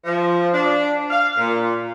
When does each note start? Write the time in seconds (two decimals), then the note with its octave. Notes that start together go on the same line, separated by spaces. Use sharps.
0.05 F3
0.54 D4
1.10 F5
1.38 A#2